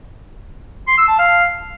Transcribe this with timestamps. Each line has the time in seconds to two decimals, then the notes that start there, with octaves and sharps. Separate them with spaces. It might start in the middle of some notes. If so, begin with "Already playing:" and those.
0.88 C6
0.98 E6
1.08 A5
1.18 F5